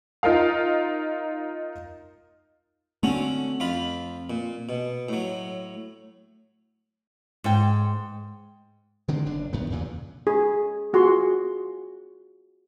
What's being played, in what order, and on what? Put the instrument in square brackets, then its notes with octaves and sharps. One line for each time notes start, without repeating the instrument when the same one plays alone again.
[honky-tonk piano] D#4 F4 A#4 F5
[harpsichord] D3 C#4 F#4 [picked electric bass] A3 C4
[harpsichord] F2 F4 B5
A#2
B2
A2 F#3
[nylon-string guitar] G#2 G5
[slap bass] D3 D#3 G#3 C4
F#1 D4
F#2 D#3 B3
E2 G2 A#2 C#3
[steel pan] G#4
F4 F#4 G#4 C6